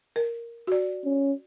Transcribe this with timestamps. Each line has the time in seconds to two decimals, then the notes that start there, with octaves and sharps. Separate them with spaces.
0.16 A#4
0.67 F#4 D5
1.05 C#4